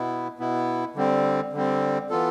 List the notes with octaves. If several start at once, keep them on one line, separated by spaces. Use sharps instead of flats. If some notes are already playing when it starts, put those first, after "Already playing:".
Already playing: B2 B3 E4
B2 B3 E4
D3 G3 C4
D3 G3 C4
E3 B3 F4 A4